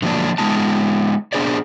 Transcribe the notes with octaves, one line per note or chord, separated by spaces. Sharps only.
D3 F3 F#3 A#3 D4
G#3 B3 D#4 A5
B3 D4 G#4 C5 D5